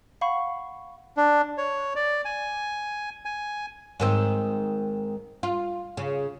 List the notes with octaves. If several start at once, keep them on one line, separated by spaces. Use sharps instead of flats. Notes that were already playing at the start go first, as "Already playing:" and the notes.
F5 F#5 B5 C#6
D4
C#5
D5
G#5
G#5
G#2 D#3 C4
F4
C#3